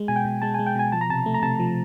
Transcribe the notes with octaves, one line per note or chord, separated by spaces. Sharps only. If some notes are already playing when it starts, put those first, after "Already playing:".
Already playing: G#3
B2 G#5
G5
B2
G#3 A5
G#3 G#5
G5
B2 G#5
F3 A5
A#5
C3 A5
A3
A#5
C3 A5
F3